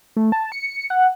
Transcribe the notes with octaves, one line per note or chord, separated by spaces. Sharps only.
A3
A5
C#7
F#5